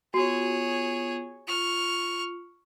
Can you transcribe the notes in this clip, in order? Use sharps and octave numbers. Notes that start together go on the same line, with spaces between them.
B3 F4 F#4 G#4 C#5
F4 C#6 F6